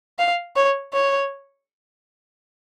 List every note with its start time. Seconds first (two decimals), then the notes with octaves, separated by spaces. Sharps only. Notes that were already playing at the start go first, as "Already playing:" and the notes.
0.19 F5
0.56 C#5
0.94 C#5